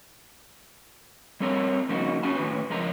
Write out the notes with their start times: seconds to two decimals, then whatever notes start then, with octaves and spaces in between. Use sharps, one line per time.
1.40 G3 C4 A4 A#4 C#5 A#5
1.89 F2 C#3 A#3 D#4 F#4
2.23 C#4 F#4 G#4 G#5 A5
2.36 A2 D#3 B4
2.70 C#2 F3 G#3 A#4 A#5